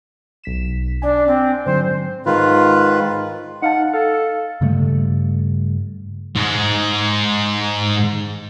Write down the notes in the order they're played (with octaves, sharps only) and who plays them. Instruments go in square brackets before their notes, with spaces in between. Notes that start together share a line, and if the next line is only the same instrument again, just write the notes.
[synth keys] B1 B6 E7
[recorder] D4 [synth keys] D5 G#5
[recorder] C4
[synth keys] G#2 D3 F#3 [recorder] C5
[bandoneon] G#2 D#3 F4 B4
[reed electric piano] D#4 F5 A5 [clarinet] F#5
[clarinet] A4 [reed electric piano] F5
[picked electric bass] G2 C#3 G3 A3
[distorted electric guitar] G#2 G#3